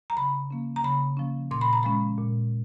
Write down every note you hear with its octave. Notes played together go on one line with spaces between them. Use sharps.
A#5
C#3 B5
F3 A#3 C#4
A#5
C#3 B5
F3 A#3 C#4
A#2 C6
B5
A#5
F3 G#3 C#4 B5
A#2